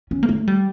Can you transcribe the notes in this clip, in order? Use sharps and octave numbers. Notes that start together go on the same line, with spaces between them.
C#4
A#3
A3
G3